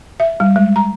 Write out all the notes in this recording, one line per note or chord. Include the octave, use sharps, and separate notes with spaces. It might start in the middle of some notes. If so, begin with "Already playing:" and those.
E5
G3
G#3
A#5